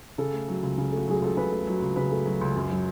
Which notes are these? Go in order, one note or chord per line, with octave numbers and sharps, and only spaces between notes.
C#3 A4
A3
F#3
C#2
C#3
A3 F#4
F#3 G#4
C#2 A4
C#3 B4
A3
F#3
C#2
C#3 B4
A3
F#3
C#2
F#2
F#3